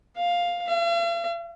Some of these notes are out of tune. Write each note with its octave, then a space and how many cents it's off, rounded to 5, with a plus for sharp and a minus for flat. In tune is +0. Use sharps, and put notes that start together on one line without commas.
F5 +5
F5 -45